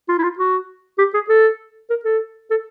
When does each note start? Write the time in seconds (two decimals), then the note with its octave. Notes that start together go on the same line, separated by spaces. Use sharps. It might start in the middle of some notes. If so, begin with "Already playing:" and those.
0.08 F4
0.18 E4
0.23 F4
0.39 F#4
0.98 G4
1.14 G#4
1.29 A4
1.90 A#4
2.04 A4
2.50 A4